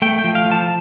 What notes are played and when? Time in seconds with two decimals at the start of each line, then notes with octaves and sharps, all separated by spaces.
0.02 A3 G5
0.19 G5
0.24 F3
0.35 F5
0.46 F3
0.52 A5